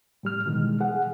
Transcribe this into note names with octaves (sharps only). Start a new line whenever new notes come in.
A2 G3 F6
B2 D#3 E3 G#3
G#4 F#5